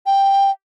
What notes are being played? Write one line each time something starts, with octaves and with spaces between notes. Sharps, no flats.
G5